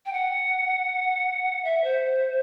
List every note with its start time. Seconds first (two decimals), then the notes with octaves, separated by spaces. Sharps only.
0.06 G5
0.13 F#5
1.64 E5
1.84 C5